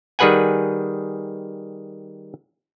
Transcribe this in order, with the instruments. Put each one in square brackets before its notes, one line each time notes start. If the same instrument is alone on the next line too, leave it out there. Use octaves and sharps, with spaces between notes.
[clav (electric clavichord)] D#3 G3 G#4 B4 F#5 G#5